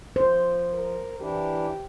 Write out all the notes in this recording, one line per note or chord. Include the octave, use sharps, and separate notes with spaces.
F3 C5
A#4
E3 D4 E4 G4